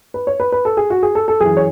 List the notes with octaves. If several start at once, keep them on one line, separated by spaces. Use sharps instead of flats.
B4
C#5
B4
B4
A4
G#4
F#4
G#4
A4
A4
F#2 E3 G#4
C#5